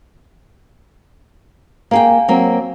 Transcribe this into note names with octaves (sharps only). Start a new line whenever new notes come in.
A#3 G#4 F5 G5 G#5
F#3 A#3 C4